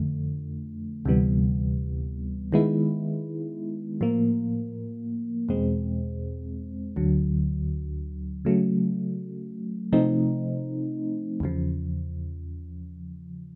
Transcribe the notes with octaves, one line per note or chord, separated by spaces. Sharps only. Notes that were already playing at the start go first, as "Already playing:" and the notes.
Already playing: F2 D3 F3 A3
D2 C3 E3 G3 B3
D#3 G#3 B3 E4
A2 F3 A#3
E2 B2 G#3 C4
D2 D3 F#3
C#3 F#3 A3
C3 F3 A3 C4 D#4
E2 C#3 F3